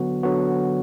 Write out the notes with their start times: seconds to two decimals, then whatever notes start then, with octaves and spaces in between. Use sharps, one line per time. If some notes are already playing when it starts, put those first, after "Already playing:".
Already playing: D3 F#3 B3 F#4
0.23 D3 F#3 B3 F#4